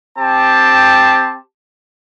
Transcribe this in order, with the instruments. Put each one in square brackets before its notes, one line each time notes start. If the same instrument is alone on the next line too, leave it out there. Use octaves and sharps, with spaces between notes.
[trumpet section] C4 G4 A5